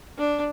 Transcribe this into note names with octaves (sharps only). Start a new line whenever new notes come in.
D4